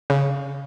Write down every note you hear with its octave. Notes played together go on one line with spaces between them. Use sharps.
C#3